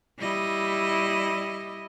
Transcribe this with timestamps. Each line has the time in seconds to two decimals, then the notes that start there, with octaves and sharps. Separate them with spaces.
0.19 G3 E4 D#5